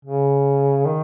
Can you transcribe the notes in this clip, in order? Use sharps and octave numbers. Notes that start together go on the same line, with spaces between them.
C#3
D#3